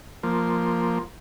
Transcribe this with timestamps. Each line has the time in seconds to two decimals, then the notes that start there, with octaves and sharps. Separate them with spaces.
0.23 F3 A#3